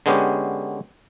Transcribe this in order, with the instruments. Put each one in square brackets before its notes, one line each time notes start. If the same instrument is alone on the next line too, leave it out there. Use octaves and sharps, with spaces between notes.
[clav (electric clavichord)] D3 G#3 B3 C#4 G4